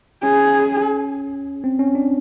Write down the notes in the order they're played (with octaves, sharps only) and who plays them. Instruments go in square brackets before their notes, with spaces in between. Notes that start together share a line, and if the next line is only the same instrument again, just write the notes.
[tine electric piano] C#4 [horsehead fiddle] G#4
[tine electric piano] C4
C#4
D4